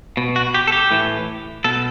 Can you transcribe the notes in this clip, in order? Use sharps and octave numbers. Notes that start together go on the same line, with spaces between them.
B2
F#4
G4
A4
G4
A2 E3
B2 A4